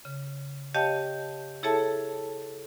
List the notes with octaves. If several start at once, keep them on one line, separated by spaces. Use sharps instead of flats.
C#3
G4 C#5 D#5 F5 G5 A5
E4 G#4 A4 C#5 E5 A5